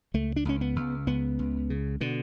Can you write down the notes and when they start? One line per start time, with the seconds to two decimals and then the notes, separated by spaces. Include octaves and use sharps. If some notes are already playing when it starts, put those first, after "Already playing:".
0.14 C#2 A3
0.36 D4
0.45 C#2 C#4
0.61 B3
0.76 C#2
1.07 C#2 B3
1.39 C#2
1.70 C#3
2.01 B2 D3